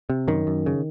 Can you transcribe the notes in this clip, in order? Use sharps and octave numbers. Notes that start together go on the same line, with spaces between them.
C3
F#2 D#3
F#2
C#3